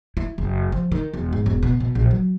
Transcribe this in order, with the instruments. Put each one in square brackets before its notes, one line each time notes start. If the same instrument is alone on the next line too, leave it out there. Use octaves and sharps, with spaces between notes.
[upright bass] E4
F#1
F3
D#3
E1
G#2
E1
B2
B2
A#1
F#3